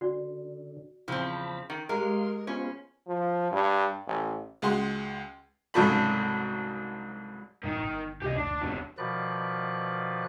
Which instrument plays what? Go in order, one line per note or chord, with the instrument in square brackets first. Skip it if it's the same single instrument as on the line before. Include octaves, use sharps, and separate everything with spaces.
[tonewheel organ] D3 [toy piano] F#4 D5
[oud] E2 C#3 E4 [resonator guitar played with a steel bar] F3 C4 [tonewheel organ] A5 B5
[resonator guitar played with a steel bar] D#3
[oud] G#3 G4 [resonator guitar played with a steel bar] A#4 [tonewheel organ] F5 C6
[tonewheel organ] B3 F4 C5 [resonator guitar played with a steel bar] C#4
[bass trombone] F3
G2
A1
[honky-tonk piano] C#2 G#3 F#4 G#4 C6
[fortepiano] C2 G#2 C#3 F#3 A4 B5
[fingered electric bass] D#1 A1 G2 [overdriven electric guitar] D#3 D#4
[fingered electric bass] G1
[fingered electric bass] G#1 D2 C3 [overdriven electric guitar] G4 D#5
[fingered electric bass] F#1 D2 [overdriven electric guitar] D4
[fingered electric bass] F#1 D#2 C4 [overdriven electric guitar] B2 D3
[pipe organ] B2 D#3 F3 B4 D5 F#6